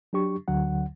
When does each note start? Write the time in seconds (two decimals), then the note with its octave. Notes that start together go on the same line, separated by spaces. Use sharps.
0.13 F#3 D4 G4 C#6
0.48 D2 D3 F#3 F#5